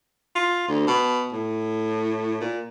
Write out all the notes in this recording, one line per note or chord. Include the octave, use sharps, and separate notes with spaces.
F4
D2
B2
A2
A#2